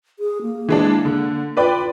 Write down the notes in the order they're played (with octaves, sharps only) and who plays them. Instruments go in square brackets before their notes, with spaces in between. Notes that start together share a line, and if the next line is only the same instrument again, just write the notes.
[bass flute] G#4
A#3
[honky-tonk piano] E3 G#3 D4
D3
[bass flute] F4 [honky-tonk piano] B4 D5 G5